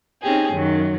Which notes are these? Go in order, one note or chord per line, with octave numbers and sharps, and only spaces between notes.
C4 C#4 D#4 G4 G#4
F#2 D#3 F#3